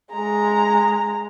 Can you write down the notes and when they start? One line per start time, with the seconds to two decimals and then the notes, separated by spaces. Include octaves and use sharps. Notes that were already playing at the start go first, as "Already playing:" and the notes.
0.12 G#3 A#5